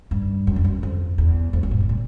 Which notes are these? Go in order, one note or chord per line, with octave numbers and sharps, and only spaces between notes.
G2
F#2
G2
F#2
F2
E2
F2
F#2
G#2
A2
A#2